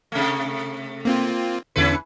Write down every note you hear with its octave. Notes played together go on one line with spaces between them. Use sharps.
C3 A3
A#3 C4 F4
E2 D3 C#4 E4 B4 C#7